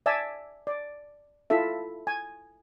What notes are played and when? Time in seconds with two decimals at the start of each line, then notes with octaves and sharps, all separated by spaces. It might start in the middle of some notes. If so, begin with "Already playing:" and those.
0.06 D5 E5 G#5 A5 E6
0.67 D5
1.50 E4 F4 A4 E5
2.07 G#5